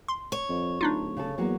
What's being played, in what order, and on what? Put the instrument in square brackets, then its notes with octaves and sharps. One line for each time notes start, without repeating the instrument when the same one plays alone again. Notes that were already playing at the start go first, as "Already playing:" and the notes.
[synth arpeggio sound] C6
[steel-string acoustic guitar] C#5
[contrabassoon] F2
[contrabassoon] D1 [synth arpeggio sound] D4 D#4 F4
[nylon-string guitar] C#3 A4
[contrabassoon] E2 [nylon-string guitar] F#3 A#3 F#4